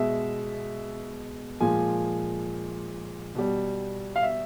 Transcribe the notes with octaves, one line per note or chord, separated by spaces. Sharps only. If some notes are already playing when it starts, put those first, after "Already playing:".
Already playing: B2 G#3 E5
A#2 F3 G#3 G#5
B2 G3
F5
E5